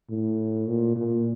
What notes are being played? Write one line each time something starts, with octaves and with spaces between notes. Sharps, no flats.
A2
A#2
A#2